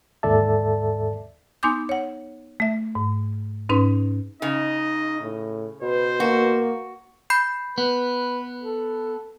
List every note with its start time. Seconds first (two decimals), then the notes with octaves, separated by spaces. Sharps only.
0.23 D#2 G#2 A4 D5 E5 A5
1.63 B3 D#4 G#5 C6 D6 G6
1.89 C#5 F#5
2.60 A3 E5
2.95 G#2
3.69 G#2 C#4 D#4 B4 C6
4.42 C#3 D#4 D#5
5.22 A2
5.82 B2 B4 C5
6.20 A#3 F#4
7.30 B5 G6 C7
7.78 B3 B4
8.61 A4